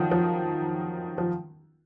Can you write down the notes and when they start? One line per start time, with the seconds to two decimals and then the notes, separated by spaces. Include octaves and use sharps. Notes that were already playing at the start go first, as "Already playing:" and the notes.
Already playing: D#3 F3 F#3
0.11 F3
1.18 F3